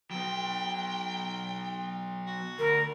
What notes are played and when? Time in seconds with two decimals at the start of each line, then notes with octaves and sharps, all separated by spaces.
0.11 F#3 B3 G5
2.27 F#4
2.59 D2 A#4